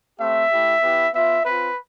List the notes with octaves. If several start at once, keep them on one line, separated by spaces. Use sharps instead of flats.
A3 C4 G4 E5
A3 E4 G4
B3 E4 G4
B3 F4 E5
C4 F4 B4